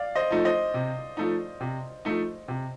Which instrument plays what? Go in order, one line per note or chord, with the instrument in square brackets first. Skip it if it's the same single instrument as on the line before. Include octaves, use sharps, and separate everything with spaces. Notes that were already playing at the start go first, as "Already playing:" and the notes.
Already playing: [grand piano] D5 F5
C5 D#5
[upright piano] F3 A3 D#4
[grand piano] C5 D#5
[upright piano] C3
F3 A3 D#4
C3
F3 A3 D#4
C3